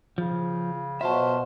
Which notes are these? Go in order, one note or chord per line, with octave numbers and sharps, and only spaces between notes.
C#3 F3
B2 F#3 F4 C5 E5 A5